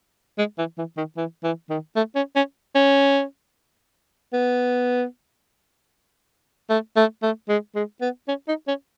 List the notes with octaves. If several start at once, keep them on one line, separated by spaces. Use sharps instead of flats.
G#3
E3
E3
D#3
E3
E3
D#3
A3
C#4
C#4
C#4
B3
A3
A3
A3
G#3
G#3
B3
C#4
D#4
C#4